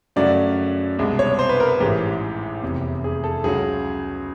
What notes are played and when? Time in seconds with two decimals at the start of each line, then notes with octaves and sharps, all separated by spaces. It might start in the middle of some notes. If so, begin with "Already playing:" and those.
0.16 F#2 C#3 F#3 A3 D5
0.99 C2 B2 G#3
1.19 C#5
1.39 C5
1.49 B4
1.60 A#4
1.80 A1 G#2 E3 G#3 G4
2.63 F1 E2 C3
3.04 G#4
3.24 A4
3.44 C#2 C#3 F#3 G#4